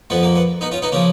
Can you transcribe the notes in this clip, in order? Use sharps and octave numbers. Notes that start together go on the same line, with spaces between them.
F2 F3 B3
A#3
B3
B3 D#4
C#4 F4
B3 D#4
C#3 F3 A#3 C#4